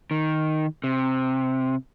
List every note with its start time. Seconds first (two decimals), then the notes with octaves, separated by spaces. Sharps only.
0.11 D#3
0.84 C3